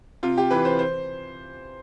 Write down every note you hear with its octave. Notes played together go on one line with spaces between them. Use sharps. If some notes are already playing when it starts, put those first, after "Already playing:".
C3 F4
G4
E3 B4
C5
C5